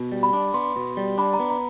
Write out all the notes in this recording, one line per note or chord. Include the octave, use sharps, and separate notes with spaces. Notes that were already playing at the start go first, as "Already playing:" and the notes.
Already playing: B2
G3
B5
D4
B3 C6
B2
G3
D4 B5
A#5
B3
A#5